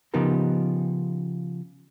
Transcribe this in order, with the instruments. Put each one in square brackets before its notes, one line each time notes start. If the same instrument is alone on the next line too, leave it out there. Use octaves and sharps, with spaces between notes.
[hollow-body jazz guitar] C#3 F3 B3 D#4 G4 A#4